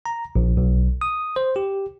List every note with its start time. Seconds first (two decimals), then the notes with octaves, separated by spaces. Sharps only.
0.06 A#5
0.36 A#1
0.57 B1
1.01 D#6
1.36 C5
1.56 G4